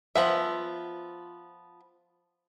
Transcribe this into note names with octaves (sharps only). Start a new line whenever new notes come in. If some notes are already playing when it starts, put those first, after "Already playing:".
F3 B3 E5